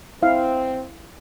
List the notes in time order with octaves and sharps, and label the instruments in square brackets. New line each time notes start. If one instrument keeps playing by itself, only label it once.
[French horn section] C4 [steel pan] E4 F5